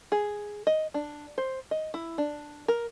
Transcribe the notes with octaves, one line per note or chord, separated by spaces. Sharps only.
G#4
D#5
D4
C5
D#5
E4
D4
A#4